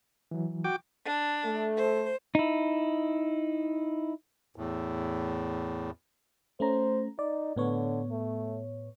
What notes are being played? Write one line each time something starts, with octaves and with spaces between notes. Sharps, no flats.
E3 F#3
F#4 G5 D6
D4
A3
C5
D#4 E4
E2 A2
A3 C#4 C5 A#5
D#4 D5
A2 D3 B3 C#5
A3